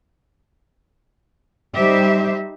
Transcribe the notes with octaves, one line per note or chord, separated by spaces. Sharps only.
G3 D#4 G4 C5 E5